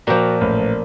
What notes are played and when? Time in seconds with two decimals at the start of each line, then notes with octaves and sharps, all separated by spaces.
0.07 A#2 F3 F#4 G5
0.41 A1